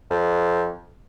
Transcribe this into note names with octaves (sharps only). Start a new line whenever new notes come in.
F2